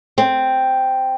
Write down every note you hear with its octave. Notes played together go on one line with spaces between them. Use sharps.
C4